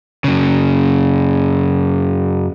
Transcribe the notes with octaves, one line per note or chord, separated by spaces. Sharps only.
F#2 C#3